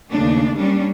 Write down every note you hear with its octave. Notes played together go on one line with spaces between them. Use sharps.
D#2 C#3 A3 D4
G3 A#3 C#4 D4